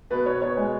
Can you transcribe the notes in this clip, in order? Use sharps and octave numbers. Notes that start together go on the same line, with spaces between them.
B2 B4
B3 C#5
B2 C#5
G#3